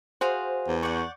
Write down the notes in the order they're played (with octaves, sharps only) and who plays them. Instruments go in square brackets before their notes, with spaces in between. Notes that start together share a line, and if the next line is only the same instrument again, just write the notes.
[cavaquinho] F#4 G#4 F5 [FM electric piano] C5
[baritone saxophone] E2
[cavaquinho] D5 F#5 [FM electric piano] C#6 G6